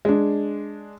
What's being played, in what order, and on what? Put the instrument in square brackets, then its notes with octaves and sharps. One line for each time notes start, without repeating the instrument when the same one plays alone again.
[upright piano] G#3 D4